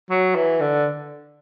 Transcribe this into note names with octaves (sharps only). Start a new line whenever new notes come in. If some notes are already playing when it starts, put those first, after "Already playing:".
F#3
E3
D3